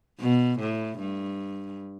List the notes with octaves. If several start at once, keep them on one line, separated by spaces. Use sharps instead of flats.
B2
A2
G2